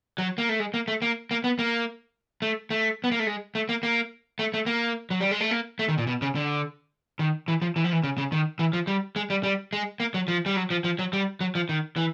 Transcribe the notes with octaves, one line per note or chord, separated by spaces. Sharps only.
F#3
A#3
A3
G#3
A#3
A3
A#3
A#3
B3
A#3
A3
A3
B3
A#3
A3
G#3
A3
A#3
A#3
A3
A3
A#3
F#3
G3
G#3
A3
A#3
A3
D#3
A#2
B2
C#3
D3
D#3
E3
F3
E3
F3
E3
C#3
C#3
D#3
E3
F3
G3
G#3
G3
G3
G#3
A#3
F#3
F3
G3
F#3
F3
F3
F#3
G3
F#3
F3
D#3
E3